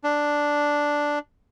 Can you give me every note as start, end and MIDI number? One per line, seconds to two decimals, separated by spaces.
0.04 1.19 62